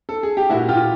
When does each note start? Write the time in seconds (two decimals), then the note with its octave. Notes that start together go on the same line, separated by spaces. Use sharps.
0.09 A4
0.23 G#4
0.37 G4
0.49 A#2 E4 F#4
0.69 A#2 F4 G4